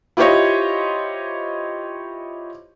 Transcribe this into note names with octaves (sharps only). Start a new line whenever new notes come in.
E4 F4 G4 C5 C#5 D#5